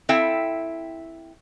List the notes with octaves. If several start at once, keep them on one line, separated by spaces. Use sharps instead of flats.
C4 E4 A4 E5 F5 G5